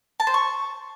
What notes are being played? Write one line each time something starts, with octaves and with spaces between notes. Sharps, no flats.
A5
C5
C#6